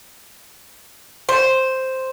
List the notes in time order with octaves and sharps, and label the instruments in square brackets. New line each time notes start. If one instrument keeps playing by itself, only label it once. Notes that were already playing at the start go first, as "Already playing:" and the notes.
[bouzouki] C5